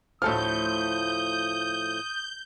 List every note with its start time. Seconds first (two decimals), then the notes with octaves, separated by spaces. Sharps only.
0.22 D2 A2 F3 A4 D#6 F6 G6